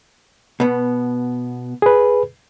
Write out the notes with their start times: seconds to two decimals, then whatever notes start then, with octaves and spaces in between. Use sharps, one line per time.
0.60 B2 B3
1.82 G#4 B4